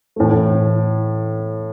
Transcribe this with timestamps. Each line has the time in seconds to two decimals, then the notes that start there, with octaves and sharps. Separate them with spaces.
0.16 A2 E3 A3